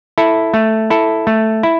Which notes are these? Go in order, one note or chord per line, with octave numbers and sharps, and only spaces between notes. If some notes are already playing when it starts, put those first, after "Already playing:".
E4 A4
A3
E4 A4
A3
E4